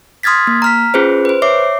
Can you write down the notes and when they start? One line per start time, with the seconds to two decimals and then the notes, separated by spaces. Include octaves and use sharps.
0.23 C6 D#6 F6 G#6 A6 B6
0.47 A#3
0.62 A#5 F6 B6
0.94 C#4 F4 G#4 B4 C5
1.25 B4 C5
1.42 C#5 E5 D6 C7